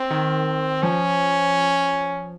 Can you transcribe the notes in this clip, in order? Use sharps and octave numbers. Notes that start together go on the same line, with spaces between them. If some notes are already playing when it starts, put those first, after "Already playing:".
Already playing: C4
D#3
F3 C#4